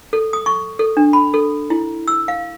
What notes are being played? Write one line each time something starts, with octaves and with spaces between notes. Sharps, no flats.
A4
D#6
C#6
A4
D4
B5
A4
E4
E6
F5